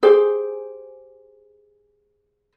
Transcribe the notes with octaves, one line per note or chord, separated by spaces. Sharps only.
G4 G#4 C5